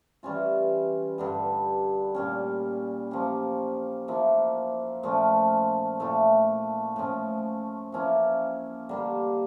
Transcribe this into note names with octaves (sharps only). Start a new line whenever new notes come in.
E3 G3 C#4 F4
G2 D3 G3
A#2 G3 C#4
F3 A#3 C#4 G4
F3 A#3 E4
A#2 F3 A3 C#4
A#2 A3 E4
A2 F3 C#4
F3 A#3 C#4 E4
D3 G3 A#3